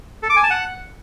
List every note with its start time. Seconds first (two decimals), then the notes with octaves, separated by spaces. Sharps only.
0.23 A4
0.30 D6
0.37 G#5
0.43 A5
0.50 F#5